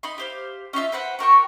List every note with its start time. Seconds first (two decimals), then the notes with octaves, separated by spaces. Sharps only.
0.03 D#4 B5 C6
0.18 G4 C5 F5
0.73 C#4 D#4 F4 E5
0.92 B4 C5 F#5 B5
1.19 F#4 A#4 G5 C#6